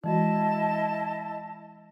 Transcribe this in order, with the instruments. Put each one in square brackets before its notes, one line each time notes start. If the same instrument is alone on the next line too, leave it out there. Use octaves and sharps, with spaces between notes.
[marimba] E3 G#3 F#4 [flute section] E4 D#5 A5